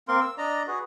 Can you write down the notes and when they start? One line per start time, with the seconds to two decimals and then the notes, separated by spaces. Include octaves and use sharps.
0.08 A#3 C4 A#4 C6
0.21 E6
0.38 D4 D5 D#5 A#5
0.68 F#4 G#4 B4